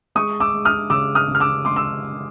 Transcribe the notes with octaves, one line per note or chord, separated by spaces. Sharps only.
G#3 C#6 D#6
D6 E6
G#3
D#6 F6
C#3 D6 E6
D#6 F6
C#3
F6
D6 E6
G#3 C6 D6
E6